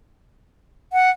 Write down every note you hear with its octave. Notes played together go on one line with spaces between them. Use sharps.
F#5